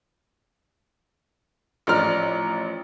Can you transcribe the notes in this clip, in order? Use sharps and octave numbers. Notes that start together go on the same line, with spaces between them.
A1 F3 D4 A#5 F6